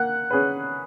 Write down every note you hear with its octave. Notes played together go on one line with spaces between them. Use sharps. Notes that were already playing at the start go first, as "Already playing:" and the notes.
Already playing: A#3 F#5
C#4 G#4 B4